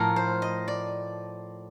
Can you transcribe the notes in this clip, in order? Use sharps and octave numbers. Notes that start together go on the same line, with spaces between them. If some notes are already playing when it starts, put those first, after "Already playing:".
Already playing: A2 F3 A3 A#4
C5
D#5
D5